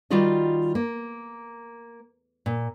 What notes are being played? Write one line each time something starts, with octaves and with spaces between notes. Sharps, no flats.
D#3 G3 F4 F#4 D5 D#5
A#3
A#2